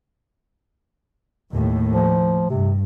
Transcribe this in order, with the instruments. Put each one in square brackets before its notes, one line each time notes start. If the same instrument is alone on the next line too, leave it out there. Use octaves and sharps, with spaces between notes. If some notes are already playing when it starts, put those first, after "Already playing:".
[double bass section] D#2 A2
[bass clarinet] F3
[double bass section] G2 [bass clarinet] C3